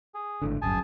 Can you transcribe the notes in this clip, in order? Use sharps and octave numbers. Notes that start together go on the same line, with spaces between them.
G#4
G#1 A2 D3
D1 G1 F#2 G#4 G#5 A5